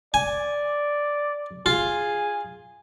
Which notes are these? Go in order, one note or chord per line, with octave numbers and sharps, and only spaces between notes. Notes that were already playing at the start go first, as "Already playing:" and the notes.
D5 G#5
F4 G#4